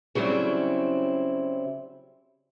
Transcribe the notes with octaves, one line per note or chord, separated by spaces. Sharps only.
C#3 F#3 G3 C4 E4